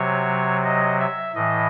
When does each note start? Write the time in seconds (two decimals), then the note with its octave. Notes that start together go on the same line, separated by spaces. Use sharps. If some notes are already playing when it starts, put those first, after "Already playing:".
Already playing: C3 F#3 C#5
0.64 D#5
0.99 E5
1.35 A2 E3 D#5